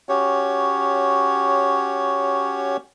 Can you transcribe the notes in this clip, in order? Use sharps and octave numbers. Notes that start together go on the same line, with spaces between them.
C#4 F#4 G4 C#5